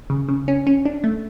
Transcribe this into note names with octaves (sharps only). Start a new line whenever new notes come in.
C#3
C#3
C#4
C#4
D4
A3